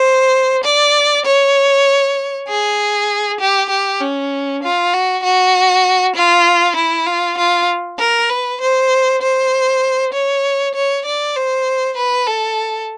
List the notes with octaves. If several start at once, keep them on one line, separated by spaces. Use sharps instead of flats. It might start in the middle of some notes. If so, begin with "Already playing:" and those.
Already playing: C5
D5
C#5
G#4
G4
G4
C#4
F4
F#4
F#4
F4
E4
F4
F4
A#4
B4
C5
C5
C#5
C#5
D5
C5
B4
A4